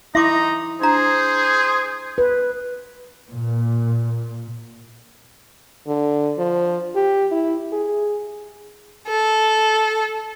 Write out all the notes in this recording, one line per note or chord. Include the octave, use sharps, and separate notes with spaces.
D#4 E4 E5 C6 D6
D4 G#4 C5 A#5
B4
A#2
D3
F3
G4
E4
G#4
A4